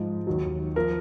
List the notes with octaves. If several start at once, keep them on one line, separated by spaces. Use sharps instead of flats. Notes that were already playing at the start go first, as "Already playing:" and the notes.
Already playing: G#2 F3
D#2 D#3 F#3
F3 A#4